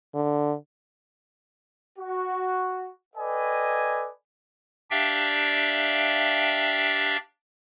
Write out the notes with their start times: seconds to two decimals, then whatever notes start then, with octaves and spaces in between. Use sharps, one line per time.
0.14 D3
1.99 F#4
3.16 A4 B4 D5 D#5 G5 G#5
4.91 D4 G4 D5 E5 F5 G5